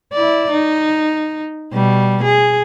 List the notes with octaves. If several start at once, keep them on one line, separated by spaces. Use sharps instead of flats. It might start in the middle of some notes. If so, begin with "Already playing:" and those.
E4 D5
D#4
B2 G3
G#4